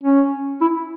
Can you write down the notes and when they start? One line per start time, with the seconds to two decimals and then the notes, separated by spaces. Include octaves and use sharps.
0.03 C#4
0.62 E4